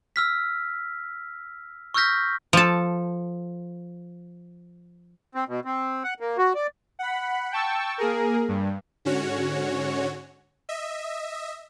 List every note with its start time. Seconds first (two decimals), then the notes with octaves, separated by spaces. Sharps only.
0.16 E6 F6 B6
1.94 C#6 E6 F6 G6 A#6 B6
2.53 F3 A4
5.35 C4
5.48 B2
5.65 C4
6.04 F#5
6.20 A#3
6.38 F#4
6.55 D5
6.99 F#5 B5
7.52 G5 A5 C#6 E6
7.98 A#3 G#4 A#4
8.48 G2
9.05 G#2 D3 C#4 F#4 C#5
10.69 D#5 E5